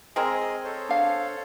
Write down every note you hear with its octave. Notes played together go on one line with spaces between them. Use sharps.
G#3 C4 G#4 A#4 D#5
A4 C5 C#5
D4 F5